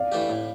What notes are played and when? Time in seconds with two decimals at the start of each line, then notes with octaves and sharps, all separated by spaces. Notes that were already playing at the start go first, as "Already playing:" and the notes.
Already playing: D5 F5
0.12 E3 A3 D4 G4
0.29 A2